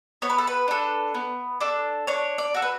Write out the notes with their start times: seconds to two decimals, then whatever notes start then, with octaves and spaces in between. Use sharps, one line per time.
0.22 B3 C#5
0.30 B4
0.38 A4
0.47 B4
0.68 D4 A4
1.14 B3
1.60 D4 A4
2.07 D4 C#5
2.38 D5
2.54 F#4 A4
2.62 B4